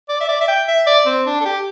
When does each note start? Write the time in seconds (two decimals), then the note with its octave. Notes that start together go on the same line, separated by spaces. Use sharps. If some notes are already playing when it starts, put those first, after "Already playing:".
0.09 D5
0.20 E5
0.29 D5
0.41 E5
0.48 G5
0.68 E5
0.86 D5
1.06 C4
1.26 D4
1.41 A4
1.45 G4